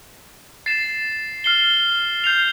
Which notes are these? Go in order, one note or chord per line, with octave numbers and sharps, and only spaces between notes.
A6 C7 E7
F6 C7 G7
G6 C7 F7